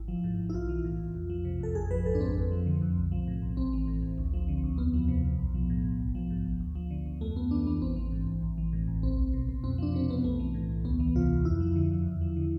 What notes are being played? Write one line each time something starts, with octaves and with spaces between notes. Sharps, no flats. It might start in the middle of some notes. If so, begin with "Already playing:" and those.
Already playing: G#1 E4
F3
G#2
G#1
E4
B1 F4
E3
A2
B1
F2
F3
C3
F2 A4
A1 G#4
F3 B4
G#2 A4
D4
A1 C4
F2
F3
D3
F2
B1
F3
A2
B1
A1 C4
E3
A2
A1
D2
F3
D3
D2
E2 B3
F3
C3
E2
B1
F3
A2
B1
G#1
F3
G#2
G#1
D2
F3
D3
D2
F2 A3
F2 B3
E3 D4
E3 B3
A1 C4
E3
G#2
A1
A1
E3
A2
A1
C2 C4
C2
B2
B2
F2 C4
F3 D4
C3 C4
F2 B3
B1 A3
E3
A2
B1
D2 B3
E3
C3 F4
D2
F2 E4
F3
D3
F2
E2
F3
D3